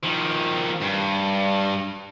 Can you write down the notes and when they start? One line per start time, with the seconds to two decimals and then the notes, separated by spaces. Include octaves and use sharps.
0.04 D#3 F3
0.82 G2